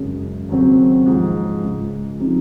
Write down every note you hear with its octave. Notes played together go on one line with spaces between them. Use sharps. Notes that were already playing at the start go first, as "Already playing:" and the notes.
Already playing: F#2 C#3 G#3
D#2 C#3 F#3 C4
G#2 F3 G#3
C#2 C#3 G#3
C#3 F3 C4 D#4